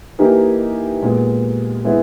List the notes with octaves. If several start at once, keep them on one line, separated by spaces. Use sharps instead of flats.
E3 A#3 D#4 G4
A#2 G#3 B3
E3 G#3 B3 E4